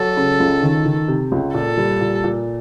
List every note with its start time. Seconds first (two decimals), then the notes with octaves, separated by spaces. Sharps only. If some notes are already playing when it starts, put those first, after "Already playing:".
Already playing: F#3 A4
0.17 C#3
0.40 C#2
0.63 D#3
0.86 D#3
1.08 C3
1.32 C#2
1.54 A#2 A4
1.78 G3
2.01 A#2
2.24 A#2